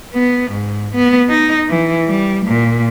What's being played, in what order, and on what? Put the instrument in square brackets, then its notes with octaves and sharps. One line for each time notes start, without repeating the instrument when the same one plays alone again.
[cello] B3
G#2
B3
D#4
E3
G3
A#2